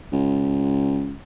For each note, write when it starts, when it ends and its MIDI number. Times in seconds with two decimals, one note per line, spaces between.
0.13 1.17 37